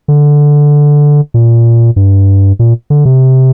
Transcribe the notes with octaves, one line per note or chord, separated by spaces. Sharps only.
D3
A#2
G2
A#2
D3
C3